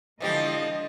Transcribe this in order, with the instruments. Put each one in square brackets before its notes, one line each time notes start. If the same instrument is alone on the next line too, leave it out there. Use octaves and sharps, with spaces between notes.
[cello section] D3 G#3 D#5 [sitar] E3 F3 G4